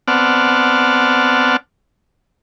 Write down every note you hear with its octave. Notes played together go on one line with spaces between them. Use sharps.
B3 C4 D5 F#5 A5 F6